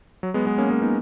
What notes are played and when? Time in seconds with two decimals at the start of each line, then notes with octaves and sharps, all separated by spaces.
0.23 F#3
0.34 G#3 B3
0.46 G#3 B3
0.58 A#3 C#4
0.70 A#3 C#4
0.81 B3 D#4